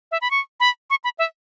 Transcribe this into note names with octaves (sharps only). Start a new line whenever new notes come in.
E5
B5
C#6
B5
C#6
B5
E5